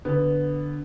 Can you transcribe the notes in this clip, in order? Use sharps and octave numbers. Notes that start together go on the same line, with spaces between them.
D3 B3